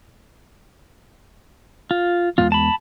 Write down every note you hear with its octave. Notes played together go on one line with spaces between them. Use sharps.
F4
E2 G#3 B3 F4
A5 B5